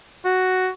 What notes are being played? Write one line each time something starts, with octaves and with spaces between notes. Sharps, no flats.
F#4